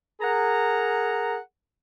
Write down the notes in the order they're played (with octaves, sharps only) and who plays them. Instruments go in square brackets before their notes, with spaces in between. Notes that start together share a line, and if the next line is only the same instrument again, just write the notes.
[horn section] G#4 A#4 F#5 A#5